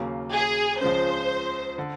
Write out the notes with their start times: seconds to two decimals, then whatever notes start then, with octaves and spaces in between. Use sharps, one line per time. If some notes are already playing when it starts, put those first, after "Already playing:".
Already playing: D#2 C#3 F#3 A#3
0.33 G#4
0.81 C#2 C#3 F3 G#3 C#4 C5
1.78 D3